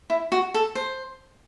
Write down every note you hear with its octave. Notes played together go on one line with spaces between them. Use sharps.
E4
F#4
A4
C5